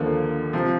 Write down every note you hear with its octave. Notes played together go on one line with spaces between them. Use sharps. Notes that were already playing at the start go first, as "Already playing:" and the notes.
Already playing: D#2 D3 F3 A#3
C3 F3